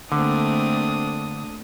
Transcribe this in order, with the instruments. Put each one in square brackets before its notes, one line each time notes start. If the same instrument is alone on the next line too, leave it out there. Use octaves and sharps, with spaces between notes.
[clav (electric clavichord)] D3 [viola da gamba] A3 A#3 C4 [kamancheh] D4 D#6